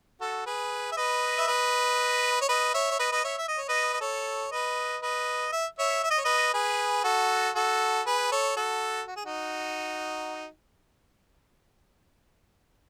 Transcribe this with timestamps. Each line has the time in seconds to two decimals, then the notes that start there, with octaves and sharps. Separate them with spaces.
0.21 F#4 A4
0.46 G#4 B4
0.92 E5
0.97 B4 D#5
1.38 E5
1.48 B4 D#5
2.41 C#5
2.49 B4 D#5
2.74 C#5 E5
2.91 C#5
2.99 B4 D#5
3.12 B4 D#5
3.24 C#5 E5
3.38 E5
3.48 D#5
3.58 C#5
3.69 B4 D#5
3.94 D#5
4.01 A4 C#5
4.51 B4 D#5
5.02 B4 D#5
5.53 E5
5.79 C#5 E5
6.04 E5
6.11 D#5
6.17 C#5
6.25 B4 D#5
6.54 G#4 B4
7.04 F#4 A4
7.55 F#4 A4
8.06 G#4 B4
8.31 A4 C#5
8.57 F#4 A4
9.08 F#4
9.17 G#4
9.26 D#4 F#4